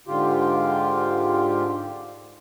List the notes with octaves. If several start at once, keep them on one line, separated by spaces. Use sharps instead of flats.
G#2 D3 F4 G4